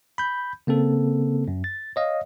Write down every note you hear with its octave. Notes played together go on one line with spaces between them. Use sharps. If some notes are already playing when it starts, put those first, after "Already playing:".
B5 G6
C#3 A#3 C4 A4
F#2
A6
C#5 D#5 F5